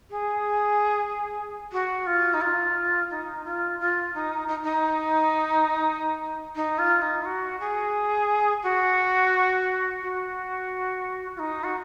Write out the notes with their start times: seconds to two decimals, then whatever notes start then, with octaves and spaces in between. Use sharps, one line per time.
0.10 G#4
1.72 F#4
2.07 F4
2.34 D#4
2.41 F4
3.10 D#4
3.45 F4
3.79 F4
4.14 D#4
4.48 D#4
4.63 D#4
6.56 D#4
6.78 F4
7.02 D#4
7.25 F#4
7.60 G#4
8.63 F#4
10.02 F#4
11.36 F4
11.39 D#4
11.64 F#4